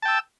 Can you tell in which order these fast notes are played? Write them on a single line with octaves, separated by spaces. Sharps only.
A5 G5 E6